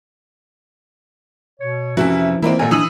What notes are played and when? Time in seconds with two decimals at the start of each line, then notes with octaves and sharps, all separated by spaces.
1.60 B2 C#5
1.97 F2 C3 E3 F3 C#4 F#4 E5
2.42 D#3 E3 G#3 A#3 C4 E4 F4 D5
2.59 A1 A#2 A4 G#5
2.71 E3 D4 D#6 E6 F#7